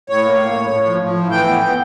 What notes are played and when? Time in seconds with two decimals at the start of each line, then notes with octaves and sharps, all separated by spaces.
0.09 A2 C#5
0.25 A#3
0.40 A2
0.55 A2
0.71 A2
0.86 F3
1.02 F3
1.17 A2
1.31 E3 G5
1.47 B3
1.63 B3